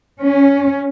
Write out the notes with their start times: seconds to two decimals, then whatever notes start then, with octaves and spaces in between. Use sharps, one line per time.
0.24 C#4